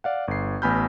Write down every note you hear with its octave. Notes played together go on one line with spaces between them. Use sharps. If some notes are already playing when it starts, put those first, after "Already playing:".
D5 F5 F#5
G1 C7
A1 B3 G#5 B5 F6 G6